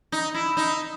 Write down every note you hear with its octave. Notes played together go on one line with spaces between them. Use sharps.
D#4
E4
D#4